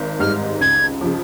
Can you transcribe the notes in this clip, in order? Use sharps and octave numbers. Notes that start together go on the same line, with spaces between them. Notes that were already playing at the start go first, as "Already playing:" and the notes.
Already playing: G#1
G#2 G3 F6
C#2 G#6
C#3 F3